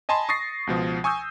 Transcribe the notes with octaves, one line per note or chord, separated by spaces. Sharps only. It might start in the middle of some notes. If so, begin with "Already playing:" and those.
D#5 G#5 A5 B5 C6
C#6 D#6 A6 A#6 C7
C#2 B2 F3
G#5 C#6 D#6 E6 G6